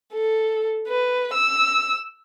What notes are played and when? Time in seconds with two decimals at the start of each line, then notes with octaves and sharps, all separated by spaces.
0.14 A4
0.88 B4
1.34 E6